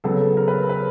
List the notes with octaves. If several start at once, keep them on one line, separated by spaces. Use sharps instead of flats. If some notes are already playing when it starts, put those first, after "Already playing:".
C#3 F#3 B3 A4
A#4
B4
B4